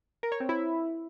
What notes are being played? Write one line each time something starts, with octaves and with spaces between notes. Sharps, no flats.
A#4
C#5
C4
E4